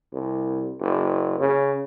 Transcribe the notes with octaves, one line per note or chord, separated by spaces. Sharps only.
C2
F#1
C#3